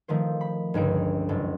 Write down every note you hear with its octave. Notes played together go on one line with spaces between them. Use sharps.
D#3 F3 A3 C5
B5
G1 C#2 D#4 D7
F#1 A4